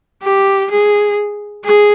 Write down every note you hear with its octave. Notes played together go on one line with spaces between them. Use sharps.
G4
G#4
G#4